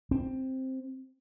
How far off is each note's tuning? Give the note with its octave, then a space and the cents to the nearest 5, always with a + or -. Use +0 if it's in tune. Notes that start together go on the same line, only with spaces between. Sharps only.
C4 +5